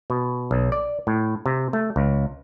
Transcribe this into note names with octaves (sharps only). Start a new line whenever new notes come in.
B2
B1
D5
A2
C3
A3
C#2